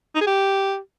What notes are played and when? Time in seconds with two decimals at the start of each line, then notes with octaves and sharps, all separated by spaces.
0.15 D#4
0.21 G#4
0.27 G4